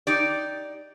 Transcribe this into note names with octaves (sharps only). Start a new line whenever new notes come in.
D#4 G4 D5